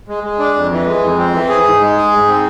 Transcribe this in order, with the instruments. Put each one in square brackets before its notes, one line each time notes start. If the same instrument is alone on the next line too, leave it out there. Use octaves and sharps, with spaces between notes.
[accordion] G#3
G#3
D4
F2
E3
G#3
F2
C4
E3
G#4
G#2
G#3
G#4
G#2
C4